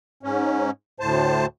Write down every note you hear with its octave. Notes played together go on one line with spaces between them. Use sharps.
G#2 C#4
D2 A2 C5 A5